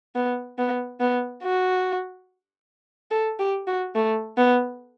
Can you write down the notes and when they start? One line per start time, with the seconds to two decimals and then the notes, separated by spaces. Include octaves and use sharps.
0.15 B3
0.59 B3
1.00 B3
1.43 F#4
3.11 A4
3.39 G4
3.67 F#4
3.95 A3
4.37 B3